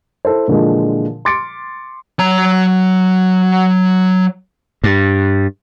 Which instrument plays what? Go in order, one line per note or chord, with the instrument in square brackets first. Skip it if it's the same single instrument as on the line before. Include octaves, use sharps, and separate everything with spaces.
[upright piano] E4 A4 C5
A#2 D3 E3 F3 G#3
C6 D6 A6 C#7 D7
[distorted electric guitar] F#3 A#5
[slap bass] G2